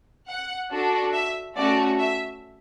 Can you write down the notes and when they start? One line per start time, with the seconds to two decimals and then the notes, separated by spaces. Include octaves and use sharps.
0.28 F#5
0.71 D4 F#4 A4
1.13 E5
1.56 A3 C#4 F#4 D5
1.99 E5